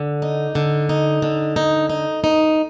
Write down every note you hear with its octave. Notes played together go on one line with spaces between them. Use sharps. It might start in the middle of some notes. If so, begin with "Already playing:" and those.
Already playing: D3
D#4
D3
D#4
D3
D#4
D#4
D#4